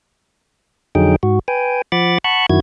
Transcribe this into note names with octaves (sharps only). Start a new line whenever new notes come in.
F2 D3 F#3 D#4 G#4 G5
G#2 F#4
B4 G5 G#5
F3 F#5 B5 D6 A6
F#5 A5 B5 C#6 F#6
F#2 D#3 E4 F#4 G#6